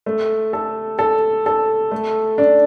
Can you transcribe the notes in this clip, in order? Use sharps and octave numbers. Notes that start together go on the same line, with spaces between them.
A3
A4
A4
A4
A3
D4